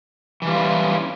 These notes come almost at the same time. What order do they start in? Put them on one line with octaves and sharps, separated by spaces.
E3 G3 F4 C#4 E4